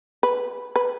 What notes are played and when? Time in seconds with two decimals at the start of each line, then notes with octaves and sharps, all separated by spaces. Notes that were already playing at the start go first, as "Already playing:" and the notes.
0.23 B4
0.76 B4